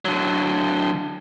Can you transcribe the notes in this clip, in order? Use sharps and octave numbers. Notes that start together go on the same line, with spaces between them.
D3 F#3